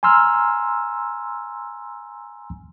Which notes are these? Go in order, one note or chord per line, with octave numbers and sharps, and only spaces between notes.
G#5 A#5 C6 E6 F6